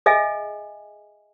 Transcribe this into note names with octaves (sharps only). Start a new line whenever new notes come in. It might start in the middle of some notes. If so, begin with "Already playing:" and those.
G#4 D#5 E5 G#5